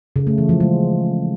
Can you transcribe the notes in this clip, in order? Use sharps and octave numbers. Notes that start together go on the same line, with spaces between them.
C#3
A3
E3
F3
G#3